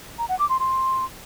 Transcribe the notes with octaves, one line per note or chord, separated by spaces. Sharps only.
A#5
F#5
D6
C6
C6